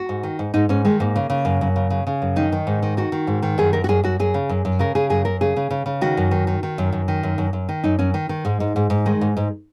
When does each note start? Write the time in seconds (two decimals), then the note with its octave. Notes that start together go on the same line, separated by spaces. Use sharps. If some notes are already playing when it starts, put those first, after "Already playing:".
Already playing: F#4
0.09 G#2
0.23 D#3
0.39 G#2
0.54 G#2 D#4
0.69 G#2 C#4
0.85 D#3 G#3
1.00 G#2 A#3
1.16 C#3
1.30 C#3
1.45 F#2
1.61 F#2
1.76 C#3
1.90 C#3
2.07 C#3
2.22 F#2
2.36 D#3 D#4
2.52 D#3
2.67 G#2
2.83 D#3
2.97 D#3 F#4
3.12 D#3
3.27 G#2
3.42 D#3
3.58 F#2 G#4
3.73 F#2 A#4
3.84 F#4
3.89 F#2 G#4
4.04 F#2 F#4
4.20 F#2 G#4
4.34 C#3
4.49 F#2
4.65 F#2
4.79 C#3 A#4
4.95 C#3 G#4
5.10 F#2 G#4
5.25 F#2 A#4
5.41 C#3 G#4
5.57 C#3
5.71 C#3
5.86 C#3
6.01 D#3 F#4
6.17 F#2
6.31 D#3
6.47 D#3
6.63 D#3
6.78 F#2
6.92 F#2
7.08 D#3
7.23 F#2
7.38 F#2
7.53 F#2
7.69 D#3
7.84 F#2 D#4
7.99 F#2 C#4
8.14 D#3
8.29 D#3
8.45 G#2 G#3
8.60 G#2
8.76 G#2
8.90 G#2
9.06 D#3 G#3
9.21 G#2
9.37 G#2